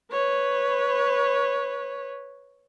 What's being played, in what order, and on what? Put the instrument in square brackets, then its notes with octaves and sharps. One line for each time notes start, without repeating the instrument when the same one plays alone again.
[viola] B4 C#5